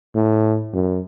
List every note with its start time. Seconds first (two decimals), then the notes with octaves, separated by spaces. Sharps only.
0.15 A2
0.73 F#2